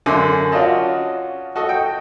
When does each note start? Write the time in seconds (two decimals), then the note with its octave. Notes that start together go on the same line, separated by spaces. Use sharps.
0.06 F#2 D3 G#5 C6 D6
0.52 C#4 F4 F#4 D5 D#5 A5
1.56 F#4 A4 D#5
1.69 G5